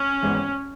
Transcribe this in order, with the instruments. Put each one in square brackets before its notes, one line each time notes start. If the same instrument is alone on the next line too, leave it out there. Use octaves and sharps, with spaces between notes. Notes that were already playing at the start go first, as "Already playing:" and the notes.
Already playing: [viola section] C#4
[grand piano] G#1 G#2 E3 B3